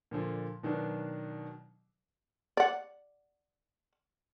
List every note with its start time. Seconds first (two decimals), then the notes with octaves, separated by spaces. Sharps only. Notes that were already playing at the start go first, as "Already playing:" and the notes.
0.11 A#2 D3 F3
0.63 B2 D#3 F#3 D4
2.57 D5 F#5